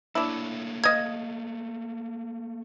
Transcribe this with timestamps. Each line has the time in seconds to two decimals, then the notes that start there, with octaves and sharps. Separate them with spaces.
0.15 A3 A#3 D4 E4 C#5
0.84 D#5 F5 G#6